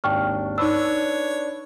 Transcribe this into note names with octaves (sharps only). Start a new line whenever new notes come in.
G#1 D#2 D4 G5 C#6 F6
D4 D#4 B4 C#5 E6